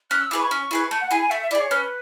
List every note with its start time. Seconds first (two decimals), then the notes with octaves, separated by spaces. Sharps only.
0.11 C#4 F#6
0.21 E6
0.31 E4 G#4 B4 D6
0.41 C#6
0.51 C#4
0.71 E4 G#4 B4
0.90 A3 A5
1.01 F#5
1.11 E4 G#4 G#5
1.21 G#5
1.30 A3 E5
1.41 E5
1.51 E4 G#4 D5
1.61 C#5
1.71 C#4 B4